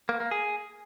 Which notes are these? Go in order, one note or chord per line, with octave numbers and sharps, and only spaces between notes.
A#3
A#3
G#4